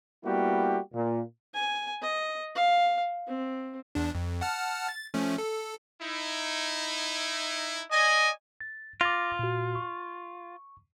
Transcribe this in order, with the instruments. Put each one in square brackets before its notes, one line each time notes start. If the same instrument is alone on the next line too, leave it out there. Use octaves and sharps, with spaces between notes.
[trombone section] G3 A#3 B3 E4 F#4 G4
A#2
[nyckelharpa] G#5
D#5
F5
C4
[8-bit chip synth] E2 D4
F2
F#5 A5 F6
A6
F3 A3 C#4
A4
[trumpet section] D#4 E4
[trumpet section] D5 G#5 [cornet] D#5
[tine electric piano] A6
[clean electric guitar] F4 [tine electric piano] D6 A6 A#6
[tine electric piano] A#2 F#4
C#6